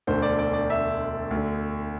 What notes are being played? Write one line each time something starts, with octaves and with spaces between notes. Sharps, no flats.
E1 D2 D3 C5
D5
D5
D5
E5
D2
D3